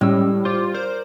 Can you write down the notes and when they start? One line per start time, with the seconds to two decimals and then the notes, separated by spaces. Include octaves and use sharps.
0.01 A2 G3 G#3 C#4 E6
0.45 F4 C5 D6
0.74 A#4 C5 D5